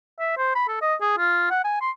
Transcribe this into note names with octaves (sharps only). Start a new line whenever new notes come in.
E5
C5
B5
A4
D#5
G#4
F4
F#5
G#5
C6